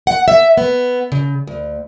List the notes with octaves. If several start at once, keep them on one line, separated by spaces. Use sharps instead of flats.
F#5
E5
B3
C#3
D2